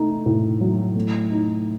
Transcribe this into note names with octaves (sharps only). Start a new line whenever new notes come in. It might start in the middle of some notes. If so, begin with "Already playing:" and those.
Already playing: A3 D#4
A2
F#3
A3
D#4